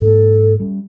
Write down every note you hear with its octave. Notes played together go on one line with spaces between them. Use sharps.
G#2 A#3 A4
G3 C#4